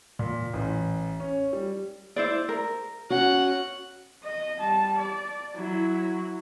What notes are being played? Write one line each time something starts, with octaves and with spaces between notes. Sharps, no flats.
A#2
A1
C#4
G3
E4 C5 D5
A#4
C#4 F#4 F#5
D#5
G3 A5
D5
F#3 E4